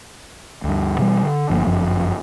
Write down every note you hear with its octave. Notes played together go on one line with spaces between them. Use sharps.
D2 G2
B2 E3 F3 G3
D3
G1 G2 F3 A#3
G1 F#2 F3